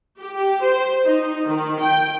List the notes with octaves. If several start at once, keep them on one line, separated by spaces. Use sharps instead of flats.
G4
C5
D#4
D#3
G5